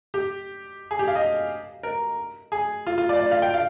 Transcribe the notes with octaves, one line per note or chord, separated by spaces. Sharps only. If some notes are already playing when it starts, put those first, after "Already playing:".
G4
G#4
G4
F5
D#5
A#4
G#4
F4
F4
D5
D5
F5
G5
F5